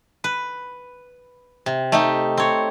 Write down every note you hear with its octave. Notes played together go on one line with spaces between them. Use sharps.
B4
C3
A3 D#4 G4
C4 C#5